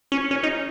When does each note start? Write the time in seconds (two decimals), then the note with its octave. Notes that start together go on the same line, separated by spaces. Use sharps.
0.12 C#4
0.31 C#4
0.43 D#4